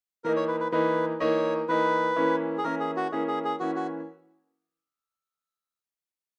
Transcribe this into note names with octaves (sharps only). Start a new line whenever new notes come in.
E3 A#3 D#4 A#4
C#5
B4
B4
E3 A#3 D#4 B4
E3 A#3 D#4 C#5
E3 A#3 D#4 B4
E3 A#3 C#4 E4
G#4
E3 A#3 C#4 E4 A#4
G#4
F#4
E3 A#3 C#4 E4 G#4
G#4
G#4
E3 A#3 C#4 E4 F#4
F#4